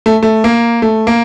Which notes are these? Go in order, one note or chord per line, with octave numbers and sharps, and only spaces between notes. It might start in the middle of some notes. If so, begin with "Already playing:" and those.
A3
A3
A#3
A3
A#3